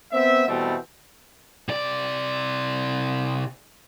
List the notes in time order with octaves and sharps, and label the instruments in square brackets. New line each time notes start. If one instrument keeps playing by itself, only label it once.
[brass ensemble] B3 C4 E5
B2 E3 G3 A3 C4
[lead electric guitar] C3 D5